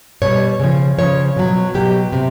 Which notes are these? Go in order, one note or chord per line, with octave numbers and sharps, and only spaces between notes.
B2 G3 C#5
C#3 F3
C#3 F3 C#5
B2 F#3
B2 F#3 G4
C3